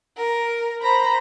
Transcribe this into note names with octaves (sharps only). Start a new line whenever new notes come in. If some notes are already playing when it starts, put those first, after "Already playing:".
A#4
C5 A#5 B5